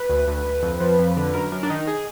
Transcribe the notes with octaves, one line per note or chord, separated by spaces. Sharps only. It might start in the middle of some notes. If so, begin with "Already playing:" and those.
Already playing: B4
D2
D2
D2
F2
F3
F2
D3
F#2 A#4
F#2 A#4
D4
D#3 D#4
G#4